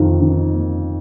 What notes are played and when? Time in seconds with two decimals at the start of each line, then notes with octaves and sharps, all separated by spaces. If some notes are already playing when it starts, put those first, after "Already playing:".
Already playing: F2 D#3
0.21 D#3
0.54 A#3